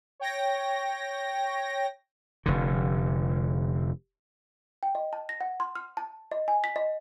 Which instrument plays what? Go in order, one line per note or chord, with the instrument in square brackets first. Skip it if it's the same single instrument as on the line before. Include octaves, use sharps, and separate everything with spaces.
[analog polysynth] C#5 G5 A#6
[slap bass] F1 D3
[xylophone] G5
D#5
A5
A#6
F#5
C6
F6
A5
D#5
G#5
B6
D#5